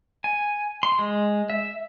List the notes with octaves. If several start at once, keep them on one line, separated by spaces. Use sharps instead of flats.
G#5
C6
G#3
E5